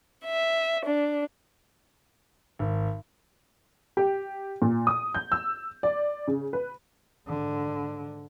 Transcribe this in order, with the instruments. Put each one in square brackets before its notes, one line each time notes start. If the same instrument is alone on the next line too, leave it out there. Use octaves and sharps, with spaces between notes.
[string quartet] E5
D4
[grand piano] G#1
[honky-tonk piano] G4
A#2
D#6
G6
E6
D5
C#3
B4
[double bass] G#2 D3